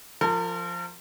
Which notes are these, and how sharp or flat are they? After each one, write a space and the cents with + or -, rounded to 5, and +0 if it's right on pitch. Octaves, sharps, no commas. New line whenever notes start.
F3 +0 A#4 -40